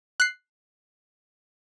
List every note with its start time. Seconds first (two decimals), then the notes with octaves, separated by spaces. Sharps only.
0.20 F#6 C7